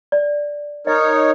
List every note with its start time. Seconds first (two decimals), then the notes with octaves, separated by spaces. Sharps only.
0.12 D5
0.87 D#4 A#4 C#5 D#5